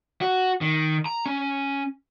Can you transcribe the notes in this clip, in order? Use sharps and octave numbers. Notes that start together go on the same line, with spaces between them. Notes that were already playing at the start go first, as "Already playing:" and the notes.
F#4
D#3
A#5
C#4